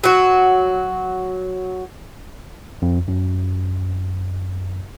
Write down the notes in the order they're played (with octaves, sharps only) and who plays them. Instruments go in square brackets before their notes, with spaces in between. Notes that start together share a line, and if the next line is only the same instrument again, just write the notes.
[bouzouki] F#3 F#4
[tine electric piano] F2
F#2